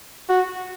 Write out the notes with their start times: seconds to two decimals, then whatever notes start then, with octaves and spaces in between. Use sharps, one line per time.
0.29 F#4